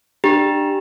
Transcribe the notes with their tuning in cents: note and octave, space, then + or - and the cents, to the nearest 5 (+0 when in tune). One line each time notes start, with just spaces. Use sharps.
D4 +25 G4 +0 A#5 +25